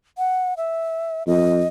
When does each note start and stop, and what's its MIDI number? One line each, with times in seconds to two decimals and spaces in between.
0.18 0.54 78
0.57 1.23 76
1.27 1.64 41
1.27 1.68 75